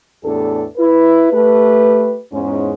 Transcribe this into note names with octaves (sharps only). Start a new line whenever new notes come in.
E2 A2 D4 G4 A4
E4 B4
A3 G4 B4
E2 G#2 C#4